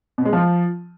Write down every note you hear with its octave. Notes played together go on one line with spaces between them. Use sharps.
B2
G#3
F3